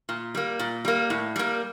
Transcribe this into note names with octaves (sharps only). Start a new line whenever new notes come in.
A#2
G3 A#3
A#2
G3 A#3
A2
G3 A#3